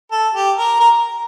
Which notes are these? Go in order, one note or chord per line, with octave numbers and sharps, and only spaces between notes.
A4
G4
A#4
A#4